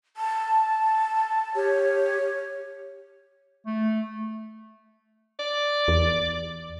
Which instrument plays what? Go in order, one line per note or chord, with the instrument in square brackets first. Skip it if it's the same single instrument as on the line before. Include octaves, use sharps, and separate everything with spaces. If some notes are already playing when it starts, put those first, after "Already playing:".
[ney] A5
[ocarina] G4 [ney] C#5
[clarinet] A3
[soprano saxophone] D5
[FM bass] E2